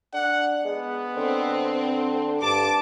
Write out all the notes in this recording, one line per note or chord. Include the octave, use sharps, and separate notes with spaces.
D4 F#5
G#3 B3
D3 C4
G2 A5 D6